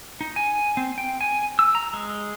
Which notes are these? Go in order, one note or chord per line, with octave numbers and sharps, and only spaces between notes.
D#4
G#5
C4
G5
G#5
E6
A#5
G#3